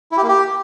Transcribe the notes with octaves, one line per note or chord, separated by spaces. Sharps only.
E4
G4
A#3
G4